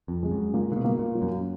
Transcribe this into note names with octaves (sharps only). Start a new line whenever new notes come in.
F2
G#3
F#2
A#2 A#3
D3
B2
A#3
A#2
F#3
F#2